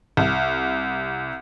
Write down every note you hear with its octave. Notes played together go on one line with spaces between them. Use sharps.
C2